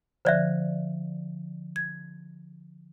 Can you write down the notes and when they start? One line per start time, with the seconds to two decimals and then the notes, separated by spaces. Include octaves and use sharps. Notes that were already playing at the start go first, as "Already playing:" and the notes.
0.25 D3 F3 C5 D5 E5 F#6
1.76 G#6